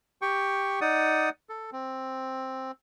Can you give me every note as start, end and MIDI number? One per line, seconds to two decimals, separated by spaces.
0.22 0.80 67
0.22 0.80 79
0.22 0.80 85
0.81 1.29 63
0.81 1.29 74
0.81 1.29 78
0.81 1.29 87
1.49 1.70 69
1.72 2.71 60